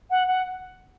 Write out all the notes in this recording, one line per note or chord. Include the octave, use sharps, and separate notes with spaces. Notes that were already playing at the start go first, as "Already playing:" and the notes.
F#5
F#5